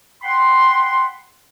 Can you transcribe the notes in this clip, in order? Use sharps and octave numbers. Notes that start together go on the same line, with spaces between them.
F#5 G5 B5 C6